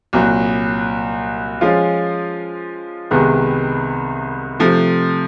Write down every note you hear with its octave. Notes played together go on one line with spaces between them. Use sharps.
C2 A#2 F#3
F3 G#3 C#4 F4
C2 C3 D#3 G#3 B3
C3 F3 A3